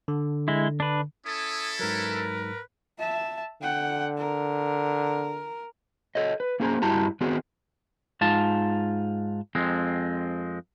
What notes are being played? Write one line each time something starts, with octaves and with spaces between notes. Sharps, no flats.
D3
G#3 E4
D4 B4
C#4 E4 A4 D#6
G#2 F#3 A#4 B4
E5 A5
D3 F#5 G5
A#4
A4 C#5 D#5
B4
A#3 C#4 G#4 C5 A5 A#5
G2 G3 E4 F#4 A5 A#5
D#3 B3 C4 F#4 G#4
G#2 F4 A5
F2 G#3 C4